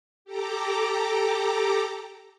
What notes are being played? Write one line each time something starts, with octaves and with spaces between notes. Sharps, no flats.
G4 A4 A#5 D6